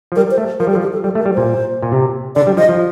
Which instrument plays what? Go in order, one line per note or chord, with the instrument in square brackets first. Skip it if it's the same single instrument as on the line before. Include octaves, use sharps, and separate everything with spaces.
[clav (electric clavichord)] F3
[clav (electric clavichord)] G3 [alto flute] A#4
[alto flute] C5
[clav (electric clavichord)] A3
[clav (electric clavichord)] F3 [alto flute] A#4
[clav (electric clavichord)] G3
[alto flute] A4
[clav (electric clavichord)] F3
[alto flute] G4
A4
[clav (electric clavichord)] G3 [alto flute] A4
[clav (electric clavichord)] A3
[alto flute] A#4
[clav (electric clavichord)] G3
[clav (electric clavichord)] A#2 [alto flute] C5
[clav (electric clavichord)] A#2
C3
[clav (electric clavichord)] D3 [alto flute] D5
[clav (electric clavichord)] G3
[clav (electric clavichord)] F3 [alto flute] D#5
[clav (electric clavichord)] F3